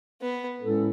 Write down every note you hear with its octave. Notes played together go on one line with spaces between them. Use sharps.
B3
A2 G#3 C#4 E4 A4